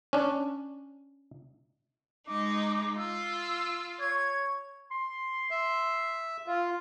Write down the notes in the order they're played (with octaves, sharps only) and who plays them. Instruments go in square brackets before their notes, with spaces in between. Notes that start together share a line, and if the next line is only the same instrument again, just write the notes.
[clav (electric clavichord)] C#4 D4
[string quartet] G#3 D#4 [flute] D6
[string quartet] F4 [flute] E6
[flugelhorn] C#5 [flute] G#6
[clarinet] C6
[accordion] E5
[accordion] F4 [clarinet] F5